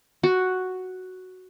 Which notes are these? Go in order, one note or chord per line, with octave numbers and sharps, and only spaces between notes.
F#4